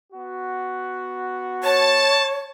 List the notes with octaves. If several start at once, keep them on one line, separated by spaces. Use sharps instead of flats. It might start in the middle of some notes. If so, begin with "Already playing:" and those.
B3 F#4
C#5 A5